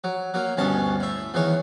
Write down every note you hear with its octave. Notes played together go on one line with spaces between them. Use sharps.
F#3
F#3 A#3
D2 G2 B2 C#4 A5
A2 E5
E2 D#3 E3 C#5